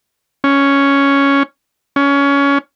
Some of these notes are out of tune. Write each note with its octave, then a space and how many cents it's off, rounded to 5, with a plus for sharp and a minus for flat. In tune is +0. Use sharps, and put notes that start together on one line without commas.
C#4 +5
C#4 +20